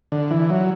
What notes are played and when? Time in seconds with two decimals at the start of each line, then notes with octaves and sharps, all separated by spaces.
0.12 D3
0.31 E3
0.50 F#3